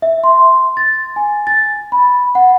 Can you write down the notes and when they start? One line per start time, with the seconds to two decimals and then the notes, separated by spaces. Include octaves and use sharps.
0.02 E5
0.24 C6
0.77 A6
1.16 G#5
1.47 A6
1.92 B5
2.35 F#5